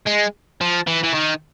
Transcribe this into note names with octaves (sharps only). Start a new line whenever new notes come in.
G#3
F3
E3
E3
D#3